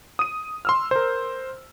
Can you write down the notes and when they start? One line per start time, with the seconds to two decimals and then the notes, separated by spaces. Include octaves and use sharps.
0.19 D#6 D#7
0.65 C6 E6 F6
0.91 A#4 C5